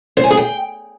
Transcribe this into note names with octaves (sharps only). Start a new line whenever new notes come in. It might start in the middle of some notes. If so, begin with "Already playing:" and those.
C5
G#5
G#4
G5